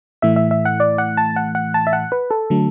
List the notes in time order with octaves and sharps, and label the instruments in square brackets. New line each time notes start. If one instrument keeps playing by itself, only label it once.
[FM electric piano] A2 E3 A3 E5
E5
E5
F#5
D5
F#5
A5
F#5
F#5
A5
E5
F#5
B4
A4
D3 F#3 A3